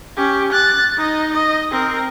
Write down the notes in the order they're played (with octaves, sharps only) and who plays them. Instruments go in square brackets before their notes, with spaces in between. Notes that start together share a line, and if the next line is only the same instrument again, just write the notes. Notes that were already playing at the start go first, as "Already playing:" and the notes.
[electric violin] C#4 G4
F#6 A6
D#4 D#5
D#5
C4 A#4